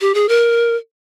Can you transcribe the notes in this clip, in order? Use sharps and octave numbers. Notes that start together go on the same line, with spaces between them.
G4
G#4
A#4